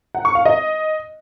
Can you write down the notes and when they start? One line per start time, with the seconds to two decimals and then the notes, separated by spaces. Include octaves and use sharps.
0.15 F#5
0.25 C#6
0.35 F5
0.45 D#5